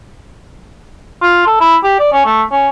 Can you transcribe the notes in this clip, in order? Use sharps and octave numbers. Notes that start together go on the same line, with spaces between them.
F4
A4
E4
G4
D5
C#4
A3
C#4